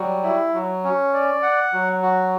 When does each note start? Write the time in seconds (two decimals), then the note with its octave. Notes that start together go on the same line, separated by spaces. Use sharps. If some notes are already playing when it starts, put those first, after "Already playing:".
Already playing: F#3 G3
0.23 E4
0.54 F#3
0.84 C#4
1.13 D5
1.42 F#5
1.73 F#3
2.02 F#4